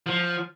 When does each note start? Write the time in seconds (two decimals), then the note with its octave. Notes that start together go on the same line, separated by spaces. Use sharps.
0.06 F3